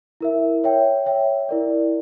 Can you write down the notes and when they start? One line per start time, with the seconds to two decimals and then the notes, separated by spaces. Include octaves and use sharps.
0.21 E4 A#4 E5
0.64 C#5 E5 G5
1.06 C#5 E5 G5
1.49 E4 A#4 D5